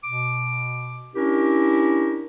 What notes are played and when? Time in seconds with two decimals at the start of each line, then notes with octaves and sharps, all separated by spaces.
0.04 B2 D6
1.15 C#4 D4 E4 G4 A#4